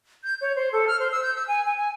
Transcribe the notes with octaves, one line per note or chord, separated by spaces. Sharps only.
G6
C#5
C5
A4
F6
C5
E6
G6
E6
G#5
G#5
G#5